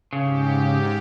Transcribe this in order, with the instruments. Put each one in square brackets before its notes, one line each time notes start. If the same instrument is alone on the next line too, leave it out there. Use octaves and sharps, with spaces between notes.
[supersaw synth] G#2 G4 [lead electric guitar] C#3